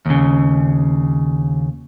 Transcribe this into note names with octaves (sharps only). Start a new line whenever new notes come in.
D#2 C#3